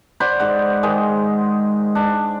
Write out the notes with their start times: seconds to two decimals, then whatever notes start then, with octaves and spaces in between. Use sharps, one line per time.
0.20 C5 D5 F#5 B5
0.39 G#2 F#5
0.83 G#2 D#3 G#3 D#5
1.95 D4